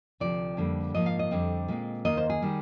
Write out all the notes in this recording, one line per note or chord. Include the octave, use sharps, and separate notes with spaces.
D2 C3 F3 D5
F2 D3 G3 A#3
G#2 F3 A#3 D#5
F5
D#5
F2 D3 G3 C4
A#2 G#3 C4
D#2 D#3 A#3 D#5
C5
G#4
D#3 G3